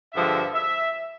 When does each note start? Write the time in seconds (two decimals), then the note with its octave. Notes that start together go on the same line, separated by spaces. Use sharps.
0.14 G2 D3 F3 G#3 E5
0.54 E5